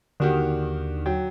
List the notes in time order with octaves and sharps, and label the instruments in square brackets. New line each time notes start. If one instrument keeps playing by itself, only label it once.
[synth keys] D#2 D3 [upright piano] A#3 F#4 G4
[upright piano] F#3 G5